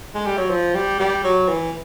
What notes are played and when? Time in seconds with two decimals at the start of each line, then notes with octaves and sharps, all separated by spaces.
0.15 G#3
0.26 G3
0.38 F#3
0.50 F3
0.75 G3
1.00 G3
1.24 F#3
1.49 E3